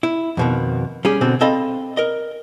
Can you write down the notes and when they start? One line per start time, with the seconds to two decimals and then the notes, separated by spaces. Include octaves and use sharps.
0.03 E4
0.37 F2 B2 D#3
1.05 G3 C#4 G#4
1.21 B2 D3 C4 F#4
1.41 C4 A4 D#5 F5 B5
1.97 A#4 D#5